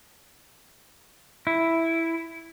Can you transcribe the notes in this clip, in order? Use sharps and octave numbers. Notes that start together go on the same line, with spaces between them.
E4